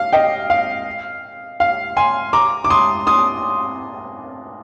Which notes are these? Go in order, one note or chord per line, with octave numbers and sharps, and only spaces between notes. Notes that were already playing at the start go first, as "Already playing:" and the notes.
Already playing: F5
D#5 G5
F5
F5
G#5 C6
A#5 D6
D6
C6 D#6
C6 D#6